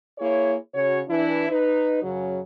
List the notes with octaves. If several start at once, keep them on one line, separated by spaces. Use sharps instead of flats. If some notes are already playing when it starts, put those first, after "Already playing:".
A#3 E4 G#4 C#5
C#3 F#4 C#5
E3 D4 E4
D#4 B4
F#2 C#3 F#3